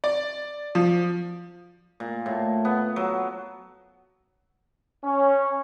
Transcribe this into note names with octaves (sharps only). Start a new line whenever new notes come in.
D5
F3
A#2
A2
B3
F#3
C#4